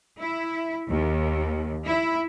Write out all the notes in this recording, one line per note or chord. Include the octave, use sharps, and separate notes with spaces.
E4
D#2
E4